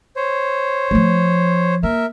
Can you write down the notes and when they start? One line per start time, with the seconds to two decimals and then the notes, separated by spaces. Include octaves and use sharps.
0.16 C5 C#5
0.91 F3 A3
1.83 A#3 A#4 E5